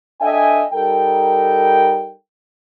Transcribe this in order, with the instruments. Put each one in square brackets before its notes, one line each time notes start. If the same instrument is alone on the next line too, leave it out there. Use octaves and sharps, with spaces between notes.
[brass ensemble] D4 A4 D#5 E5 G5 G#5
G3 D#4 A4 A#4 G5